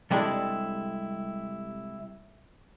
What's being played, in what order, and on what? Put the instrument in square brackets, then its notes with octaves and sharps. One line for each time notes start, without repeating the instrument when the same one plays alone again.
[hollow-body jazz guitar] C3 G3 G#3 D4 E4 A4